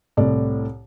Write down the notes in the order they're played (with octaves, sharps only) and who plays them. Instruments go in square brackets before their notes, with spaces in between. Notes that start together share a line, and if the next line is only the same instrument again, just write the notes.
[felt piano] C2 A2 D5